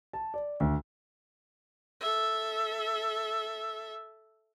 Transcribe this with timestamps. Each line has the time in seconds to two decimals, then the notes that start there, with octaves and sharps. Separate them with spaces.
0.13 A5
0.34 D5
0.60 D2
2.00 A4 E5